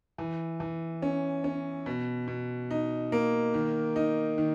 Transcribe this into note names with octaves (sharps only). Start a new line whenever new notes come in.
E3
E3
C#4
C#4
B2
B2
D#4
A#3
D#3
D#4
D#3